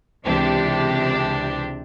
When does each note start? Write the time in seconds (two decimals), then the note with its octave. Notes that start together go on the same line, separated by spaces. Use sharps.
0.24 C#2 C3 E3 D4 G4